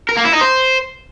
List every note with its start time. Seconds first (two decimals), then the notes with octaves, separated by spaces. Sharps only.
0.09 A#4
0.17 A#3
0.25 E4
0.33 D#4
0.41 C5